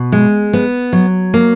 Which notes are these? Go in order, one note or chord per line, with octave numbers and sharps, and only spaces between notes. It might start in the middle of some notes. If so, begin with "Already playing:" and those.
Already playing: B2
G#3
B3
F#3
A#3